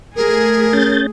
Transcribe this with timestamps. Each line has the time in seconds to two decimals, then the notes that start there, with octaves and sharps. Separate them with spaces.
0.16 A3 G#4 A#4
0.73 C#4 G6 A6